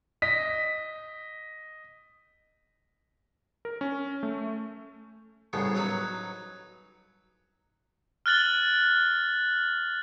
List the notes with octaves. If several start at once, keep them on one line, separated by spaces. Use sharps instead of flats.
D#5 B6
A#4
C#4
A3
C2 A2 C#3 B3
F#3 D#4 F#4 B4
F6 F#6 A6 F#7 G7